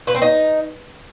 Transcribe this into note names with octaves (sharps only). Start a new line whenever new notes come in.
B4
C4
D#4